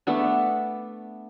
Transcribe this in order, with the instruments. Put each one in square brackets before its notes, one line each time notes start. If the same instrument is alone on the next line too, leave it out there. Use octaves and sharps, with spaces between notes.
[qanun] A3 B3 D4